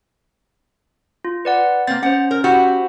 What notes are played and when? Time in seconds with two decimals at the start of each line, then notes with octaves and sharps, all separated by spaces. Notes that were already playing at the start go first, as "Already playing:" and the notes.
1.25 F4
1.45 B4 D5 F#5
1.87 A#3 C4 A6
2.03 C#4 C5 F#5
2.31 A#4
2.44 E4 F#4 G4